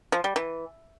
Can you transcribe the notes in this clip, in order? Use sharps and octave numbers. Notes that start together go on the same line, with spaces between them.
F3
G3
E3